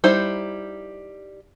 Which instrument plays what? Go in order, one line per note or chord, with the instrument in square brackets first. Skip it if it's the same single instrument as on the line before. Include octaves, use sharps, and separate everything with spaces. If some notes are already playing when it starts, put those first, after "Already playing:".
[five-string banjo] G3 D#4 E4 C5